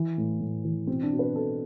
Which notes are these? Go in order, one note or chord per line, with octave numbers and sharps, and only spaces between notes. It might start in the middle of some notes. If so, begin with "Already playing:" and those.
Already playing: E3
A2
A2
E3
B2 C4
D4
B2
B4
B2 A4